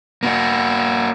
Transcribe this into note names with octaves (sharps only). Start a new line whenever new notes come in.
A#3 F#4